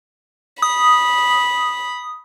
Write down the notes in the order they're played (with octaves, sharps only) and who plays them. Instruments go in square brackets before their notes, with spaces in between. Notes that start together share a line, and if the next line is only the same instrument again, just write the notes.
[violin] B5 [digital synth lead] D#6